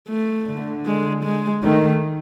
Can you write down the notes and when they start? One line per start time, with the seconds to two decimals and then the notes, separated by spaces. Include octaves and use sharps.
0.09 A3
0.47 D3
0.86 G#3
1.24 G#3
1.63 D#3 A3